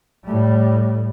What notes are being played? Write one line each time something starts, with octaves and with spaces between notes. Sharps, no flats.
A2 G3